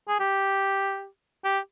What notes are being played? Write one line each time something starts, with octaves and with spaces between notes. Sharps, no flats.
G#4
G4
G4